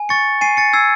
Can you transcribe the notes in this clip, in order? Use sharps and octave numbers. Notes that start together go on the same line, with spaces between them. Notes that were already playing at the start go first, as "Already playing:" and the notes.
Already playing: G#5
C#6 A6 C#7
G#5 C7 D#7
A6 C#7
E6 G#6 C7